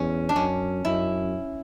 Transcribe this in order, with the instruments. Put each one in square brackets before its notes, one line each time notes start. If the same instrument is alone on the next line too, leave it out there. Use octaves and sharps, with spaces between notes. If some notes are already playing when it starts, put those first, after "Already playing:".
Already playing: [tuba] E2 [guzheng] C#4
[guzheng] D4
[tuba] F#2 [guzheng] C#4
[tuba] F#2 [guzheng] E4